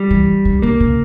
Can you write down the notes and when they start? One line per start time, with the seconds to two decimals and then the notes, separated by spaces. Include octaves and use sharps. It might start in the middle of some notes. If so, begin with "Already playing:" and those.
Already playing: G3
0.10 E3
0.45 D3
0.62 D3 A#3
0.80 C#3